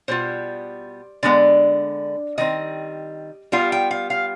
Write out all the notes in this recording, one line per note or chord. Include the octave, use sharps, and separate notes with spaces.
B2 G3 B3 F4 C5
D3 G#3 B3 D5
D#3 G3 C4 D#5
G3 B3 F4 F5
G5
F5
F5